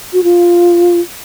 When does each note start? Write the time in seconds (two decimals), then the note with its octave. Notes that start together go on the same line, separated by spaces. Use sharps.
0.13 F#4
0.24 F4